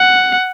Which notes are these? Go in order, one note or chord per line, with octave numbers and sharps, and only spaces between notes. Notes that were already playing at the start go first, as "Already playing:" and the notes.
Already playing: F#5